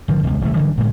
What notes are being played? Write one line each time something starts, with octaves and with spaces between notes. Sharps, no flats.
G#1 D3 F3
E1 C#2
D#1 C2 A3
F#1 D3 E3 G3
G1 A2 G#3